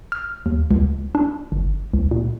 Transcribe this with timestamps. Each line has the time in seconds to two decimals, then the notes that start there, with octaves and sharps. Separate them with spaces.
0.12 F6
0.46 D#2
0.71 C#2
1.15 D4
1.52 G1
1.94 C#2
2.11 A#2